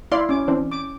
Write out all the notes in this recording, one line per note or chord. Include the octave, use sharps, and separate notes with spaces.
E4 D5 F5 C6
C#4 D6
E3 C4 D4
D6